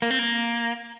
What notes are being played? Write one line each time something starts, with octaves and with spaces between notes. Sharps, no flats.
A#3
C4
A#3